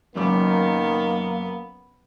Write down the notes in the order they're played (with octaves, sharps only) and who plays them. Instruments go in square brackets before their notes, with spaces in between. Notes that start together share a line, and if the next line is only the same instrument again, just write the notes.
[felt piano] F#1 F#2 D6 [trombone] D#3 [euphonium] A#3 [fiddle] B3